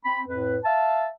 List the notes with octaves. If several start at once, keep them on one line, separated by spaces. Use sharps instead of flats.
C4 B5
F2 A2 B4
E5 F5 A5